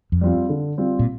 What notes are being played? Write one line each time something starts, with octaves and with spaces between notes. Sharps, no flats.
F2
G3 C4 F4
D3
G3 C4 F4
A#2